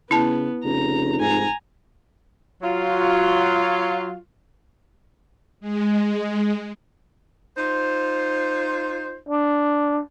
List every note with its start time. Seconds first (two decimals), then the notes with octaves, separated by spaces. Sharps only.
0.11 C#3 B3 E4 A5
0.65 F1 C#3 A#5
1.20 G#2 G#5 A#5
2.62 F#3 F4
5.60 G#3
7.57 D#4 F4 C5
9.29 D4